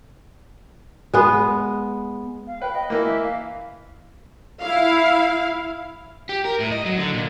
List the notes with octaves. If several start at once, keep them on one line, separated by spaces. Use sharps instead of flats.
G#3 B3
F5
B4 G5
D#5
E3 A#3
E5
F5
E4 F5
G4
A#4
A2
D#5
F#3
D3
A#2